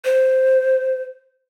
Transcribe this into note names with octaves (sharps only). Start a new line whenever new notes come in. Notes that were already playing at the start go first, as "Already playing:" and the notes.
C5